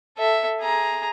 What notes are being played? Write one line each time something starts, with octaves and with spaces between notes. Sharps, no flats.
A4 E5
G#4 A#5